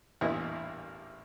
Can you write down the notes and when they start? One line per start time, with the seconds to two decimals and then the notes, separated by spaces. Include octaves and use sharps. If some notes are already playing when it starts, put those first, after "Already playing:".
0.21 A1 E2 G2 A#2 E4 D#5